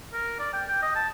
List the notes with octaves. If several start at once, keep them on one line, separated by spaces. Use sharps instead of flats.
A#4
D5
G5
G5
D#5
A5